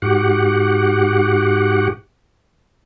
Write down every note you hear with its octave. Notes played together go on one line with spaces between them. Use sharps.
G#2 F#4 G4 F#5